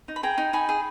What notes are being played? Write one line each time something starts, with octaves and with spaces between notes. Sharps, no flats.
D#4
B5
G#4 G5 A#5
D#4
D#4 G#5 B5
G#4